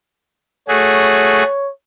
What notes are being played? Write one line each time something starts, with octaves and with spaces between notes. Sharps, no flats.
A3 F#4 G#4 C#5